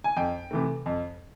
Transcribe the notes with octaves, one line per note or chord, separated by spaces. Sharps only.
G#5
F2 G5
C3 E3 A3
F2